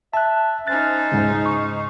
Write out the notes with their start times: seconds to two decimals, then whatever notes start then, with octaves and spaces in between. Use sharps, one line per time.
0.14 E5 A5 F#6
0.67 C#4 D#4 C5 F#6 A6
1.12 C#2 G#2 C#3
1.46 C#6